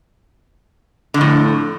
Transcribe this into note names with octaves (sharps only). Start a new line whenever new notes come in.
F2 A2 D3